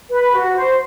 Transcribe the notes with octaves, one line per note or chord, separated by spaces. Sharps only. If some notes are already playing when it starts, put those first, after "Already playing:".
B4
F#4
C5